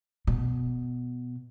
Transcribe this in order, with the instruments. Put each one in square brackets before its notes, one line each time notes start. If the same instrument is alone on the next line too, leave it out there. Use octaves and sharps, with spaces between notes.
[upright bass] B2